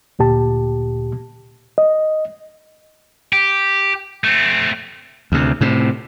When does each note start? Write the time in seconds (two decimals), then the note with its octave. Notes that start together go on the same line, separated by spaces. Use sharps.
0.19 D2 A#2 G4 A5
1.78 D#5
3.33 G4
4.24 A3 C4
5.32 D2 C3
5.61 A2 C3